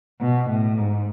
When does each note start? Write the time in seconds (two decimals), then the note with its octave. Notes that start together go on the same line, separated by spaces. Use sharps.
0.21 B2
0.50 A2
0.78 G#2